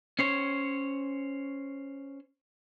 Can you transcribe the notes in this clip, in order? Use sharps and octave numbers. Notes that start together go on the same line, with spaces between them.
C#4 C5 C#5